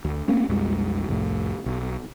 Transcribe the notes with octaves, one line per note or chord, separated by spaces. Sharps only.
D2
A3 A#3 C4 C#4
B1 F2 G3 G#3
C2 F2 A2
B1